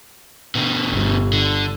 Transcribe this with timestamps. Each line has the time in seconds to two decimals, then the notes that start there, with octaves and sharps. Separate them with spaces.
0.55 B2 D3
0.90 G1
1.33 D3